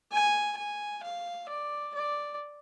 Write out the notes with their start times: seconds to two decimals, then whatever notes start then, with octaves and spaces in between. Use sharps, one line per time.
0.12 G#5
0.57 G#5
1.03 F5
1.49 D5
1.95 D5